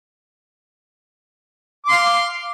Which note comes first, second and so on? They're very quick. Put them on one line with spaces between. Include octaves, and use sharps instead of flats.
D6 C6 F5